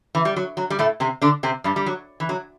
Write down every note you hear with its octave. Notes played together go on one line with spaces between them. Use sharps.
E3
G3
F#3
F#3
G3
A2 A3
C3 C4
D3 D4
C3 C4
G2 G3
G3
F#3
E3
F#3